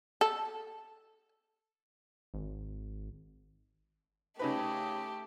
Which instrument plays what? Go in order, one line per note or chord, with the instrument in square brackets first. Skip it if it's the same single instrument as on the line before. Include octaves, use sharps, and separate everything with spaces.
[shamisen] A4
[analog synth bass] G#1
[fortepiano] C#3 D#4 B4 [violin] A3 G4